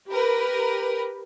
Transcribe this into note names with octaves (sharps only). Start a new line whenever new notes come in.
G4 A#4 B4